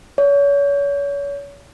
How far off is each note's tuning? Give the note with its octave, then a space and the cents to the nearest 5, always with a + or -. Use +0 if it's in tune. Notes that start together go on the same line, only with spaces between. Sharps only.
C#5 +35